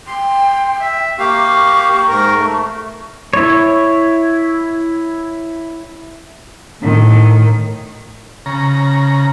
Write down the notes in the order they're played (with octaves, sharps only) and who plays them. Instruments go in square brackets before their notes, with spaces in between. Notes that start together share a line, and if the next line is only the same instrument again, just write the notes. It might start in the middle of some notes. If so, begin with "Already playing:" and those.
[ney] G5 [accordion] C6
[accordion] E5
[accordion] A#3 G4 F5 [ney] C#6
[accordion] G#2 A#4
A3
[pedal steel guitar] E4 C#5
[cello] A2 D#3
[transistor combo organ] C#3 A#5